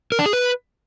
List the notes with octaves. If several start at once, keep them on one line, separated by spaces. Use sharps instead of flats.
A#4
D4
G#4
B4